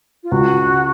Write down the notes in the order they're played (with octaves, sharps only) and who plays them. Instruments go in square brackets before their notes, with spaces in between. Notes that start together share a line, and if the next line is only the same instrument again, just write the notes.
[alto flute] F4
[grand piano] C#2 [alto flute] F#4